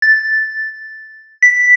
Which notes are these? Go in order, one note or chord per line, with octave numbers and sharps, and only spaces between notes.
A6
B6